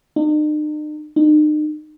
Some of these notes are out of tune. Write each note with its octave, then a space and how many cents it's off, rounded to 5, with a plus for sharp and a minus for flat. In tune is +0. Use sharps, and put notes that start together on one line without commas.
D#4 -45
D#4 -40